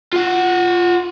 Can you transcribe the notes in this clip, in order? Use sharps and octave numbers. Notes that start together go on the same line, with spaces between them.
F4 F#5